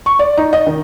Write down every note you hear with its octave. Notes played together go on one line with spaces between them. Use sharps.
C#6
D5
D#4
D#5
D#3